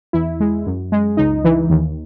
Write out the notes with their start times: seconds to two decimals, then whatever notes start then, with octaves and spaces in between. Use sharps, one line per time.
0.13 E2 E4
0.40 G#3
0.66 F#2
0.92 G#3
1.17 C#2 D#4
1.44 E3
1.70 D#2